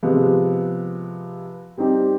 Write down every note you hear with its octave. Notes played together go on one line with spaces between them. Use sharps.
C3 F3 G#3 B3
G3 C4 D#4 G4